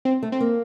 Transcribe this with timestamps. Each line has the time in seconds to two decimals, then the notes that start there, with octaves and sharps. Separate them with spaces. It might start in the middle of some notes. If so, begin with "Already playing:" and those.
0.05 C4
0.23 A3
0.32 C4
0.40 A#3